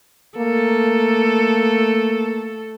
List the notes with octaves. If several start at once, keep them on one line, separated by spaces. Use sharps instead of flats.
A3 A#3 A4